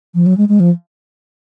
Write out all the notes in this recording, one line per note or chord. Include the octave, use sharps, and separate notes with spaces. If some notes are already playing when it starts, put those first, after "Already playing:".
F3
F#3
G#3
G#3
F3